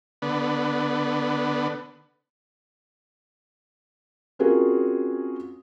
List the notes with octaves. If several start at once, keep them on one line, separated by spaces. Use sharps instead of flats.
D3 B3
C4 C#4 F4 F#4 G#4 A#4